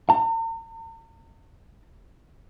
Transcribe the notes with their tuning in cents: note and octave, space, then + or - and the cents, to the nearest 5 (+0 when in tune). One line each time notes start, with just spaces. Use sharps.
A#5 -45